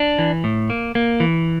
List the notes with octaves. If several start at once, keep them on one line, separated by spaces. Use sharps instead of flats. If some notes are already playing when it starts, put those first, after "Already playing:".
Already playing: D4
E3
A2
A#3
A#3
E3